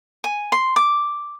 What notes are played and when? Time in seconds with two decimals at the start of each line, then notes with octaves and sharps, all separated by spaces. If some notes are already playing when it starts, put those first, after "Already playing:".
0.24 G#5
0.52 C6
0.76 D6